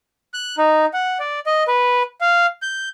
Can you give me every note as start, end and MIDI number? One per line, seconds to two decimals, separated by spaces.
0.34 0.56 90
0.58 0.85 63
0.94 1.18 78
1.20 1.40 74
1.46 1.64 75
1.68 2.03 71
2.21 2.46 77
2.62 2.89 91